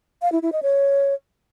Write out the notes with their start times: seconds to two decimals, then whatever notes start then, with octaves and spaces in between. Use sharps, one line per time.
0.22 F5
0.32 E4
0.42 E4
0.52 D#5
0.63 C#5